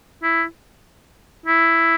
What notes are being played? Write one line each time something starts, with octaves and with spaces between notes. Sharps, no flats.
E4
E4